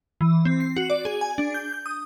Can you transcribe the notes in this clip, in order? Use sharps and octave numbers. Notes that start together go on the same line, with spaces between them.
E3
C4
C7
F#4
D5
G#4
G#5
D4
G6
G6
D#6